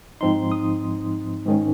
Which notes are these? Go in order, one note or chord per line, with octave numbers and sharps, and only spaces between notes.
G#2 F3 C4 D#4 C6
D#6
G#2 D#3 G#3 C#4